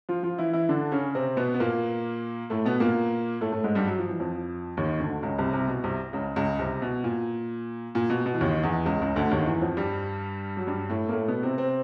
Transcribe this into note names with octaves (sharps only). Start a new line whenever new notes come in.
F3 F4
F3 F4
E3 E4
E3 E4
D3 D4
C#3 C#4
C3 C4
B2 B3
B3
A#2 A#3
A2 A3
B2 B3
A#2 A#3
A2 A3
A2 A3
G#2 G#3
G2 G3
F#3
F3
E3
F2 F3
D#2 D#3
D2 D3
C#2 C#3
C2 C3
C2 C3
B2
C2 C3
C#2 C#3
C#2 C#3
C2 C3
B2
A#2
A#2
B2
B2
E3
D#2 D#3
E2 E3
C#2 C#3
C#2 C#3
D2 D3
D#2 D#3
E2 E3
F2 F3
G2 G3
F#3
G2 G3
A2 A3
A#3
A2 A3
B2 B3
C3 C4
C3 C4